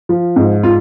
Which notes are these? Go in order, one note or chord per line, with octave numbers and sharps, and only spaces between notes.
F3
G#2
F4